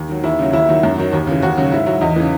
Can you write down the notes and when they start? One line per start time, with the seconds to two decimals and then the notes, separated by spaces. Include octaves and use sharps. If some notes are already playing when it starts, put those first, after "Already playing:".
Already playing: D#2
0.09 D#3 F#3
0.24 D#2 E4
0.39 C#3 F#3
0.53 D#2 E4
0.69 D#3 F#3
0.83 F#2
0.98 D#3 F#3
1.13 D#2
1.27 C#3 E3
1.42 D#2 F#4
1.57 C#3 F#3
1.72 G#2 E4
1.86 F#3
2.01 E2 D#4
2.16 C#3 E3